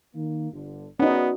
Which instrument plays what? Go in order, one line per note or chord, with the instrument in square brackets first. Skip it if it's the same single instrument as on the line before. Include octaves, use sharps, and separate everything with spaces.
[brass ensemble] D#3 A#3
G1 D3
[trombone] B3 [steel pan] C#4 D#4 [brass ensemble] F#4 D5